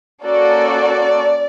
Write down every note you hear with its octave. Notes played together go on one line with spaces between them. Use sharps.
A#3 C#4 F#4 A4 D5